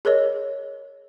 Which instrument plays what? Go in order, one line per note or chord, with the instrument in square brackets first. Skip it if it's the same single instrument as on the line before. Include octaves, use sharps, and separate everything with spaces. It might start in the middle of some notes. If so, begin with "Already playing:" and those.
[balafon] G#4 A#4 C#5 D#5